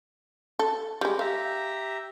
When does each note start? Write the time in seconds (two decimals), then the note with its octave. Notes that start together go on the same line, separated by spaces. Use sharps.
0.59 A4
1.01 G3 G#3
1.19 G4 E5 F5 A#5